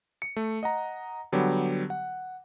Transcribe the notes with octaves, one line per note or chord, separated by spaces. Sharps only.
C#7
A3
D#5 F#5 A#5
D3 F#3 G3 B3 G4
F#5